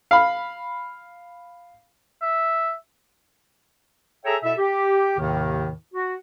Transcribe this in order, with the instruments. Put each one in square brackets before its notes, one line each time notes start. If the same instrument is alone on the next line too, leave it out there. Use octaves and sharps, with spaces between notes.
[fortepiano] F5 B5
[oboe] E5
[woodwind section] G#4 A4 C#5 E5 G5 A#5
B2 E4 A4 E5
G4
D#2 A2 C3 D#3
F#4